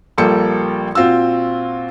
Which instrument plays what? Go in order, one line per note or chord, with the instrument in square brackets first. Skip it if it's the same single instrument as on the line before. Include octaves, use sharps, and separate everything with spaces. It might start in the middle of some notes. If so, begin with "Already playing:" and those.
[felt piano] A#1 G3 A#3 A4 G5 C#7
A#2 C4 F4 F#4 E6